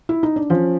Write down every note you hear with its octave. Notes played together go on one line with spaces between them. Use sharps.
E4
D#4
D4
F3 C#4